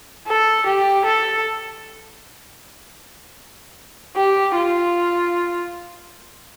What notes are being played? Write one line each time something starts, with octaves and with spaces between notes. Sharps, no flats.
A4
G4
A4
G4
F4